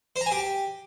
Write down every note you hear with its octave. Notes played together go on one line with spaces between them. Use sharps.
C5
A#5
G#5
G4